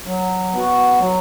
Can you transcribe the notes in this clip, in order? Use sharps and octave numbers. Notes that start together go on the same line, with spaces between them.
F#3
B3 F#4
F#3